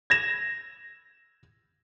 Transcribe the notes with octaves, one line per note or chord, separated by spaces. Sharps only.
G#6 A#6 E7